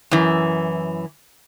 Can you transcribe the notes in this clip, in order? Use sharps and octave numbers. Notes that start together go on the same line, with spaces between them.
F#2 E3